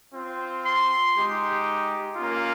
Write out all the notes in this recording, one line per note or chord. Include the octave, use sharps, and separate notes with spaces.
C4 F4
C6
G#3 D#4 G4
A#3 C#4 F4